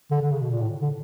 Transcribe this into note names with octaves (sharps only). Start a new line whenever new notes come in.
D3
D3
C#3
B2
A#2
A2
D3